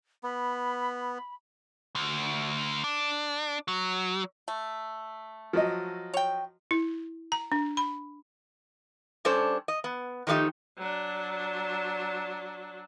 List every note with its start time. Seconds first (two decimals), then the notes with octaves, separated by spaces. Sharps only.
0.23 B3 B5
1.95 D2
2.84 D4
3.68 F#3
4.48 A3
5.53 F3 F#3 D#5
6.14 C#5 G5
6.71 E4
7.32 A#5
7.52 D4
7.77 B5
9.25 G3 C#4 D4 A4 C5
9.68 D#5
9.84 B3
10.27 D#3 F3 A3 D#4 G4
10.78 F#3 D4